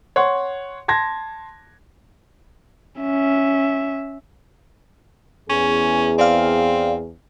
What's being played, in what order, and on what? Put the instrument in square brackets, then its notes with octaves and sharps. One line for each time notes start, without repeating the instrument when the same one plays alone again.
[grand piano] C#5 F#5 C6
A5 C6 G#6 A#6
[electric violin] C#4 E5
[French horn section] E2 G#4 [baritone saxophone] C#4
[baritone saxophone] C4 [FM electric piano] D5 F5